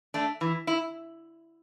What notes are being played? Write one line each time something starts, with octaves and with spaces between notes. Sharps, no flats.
A3 D4
E3
E4